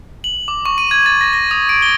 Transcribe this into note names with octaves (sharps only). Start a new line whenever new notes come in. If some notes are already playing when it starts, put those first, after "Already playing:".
F#7
D6
C#6
D#7
G#6
A6
A#6
A#6
D#6
D7
G7